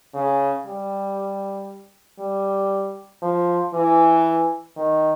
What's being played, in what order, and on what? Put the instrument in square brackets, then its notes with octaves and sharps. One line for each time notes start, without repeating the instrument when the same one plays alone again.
[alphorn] C#3
G3
G3
F3
E3
D#3